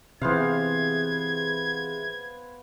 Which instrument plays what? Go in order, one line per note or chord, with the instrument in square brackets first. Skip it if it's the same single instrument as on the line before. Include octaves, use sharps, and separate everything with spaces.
[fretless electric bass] C3 E3 [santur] B3 C5 F5 [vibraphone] G#4 E5 [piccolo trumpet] G#6